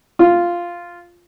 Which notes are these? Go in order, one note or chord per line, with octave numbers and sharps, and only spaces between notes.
F4